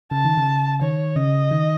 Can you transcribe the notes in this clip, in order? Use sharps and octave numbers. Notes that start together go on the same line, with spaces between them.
C#3 A5
D#3
C#3
D#3 C#5
C#3 D#5
D#3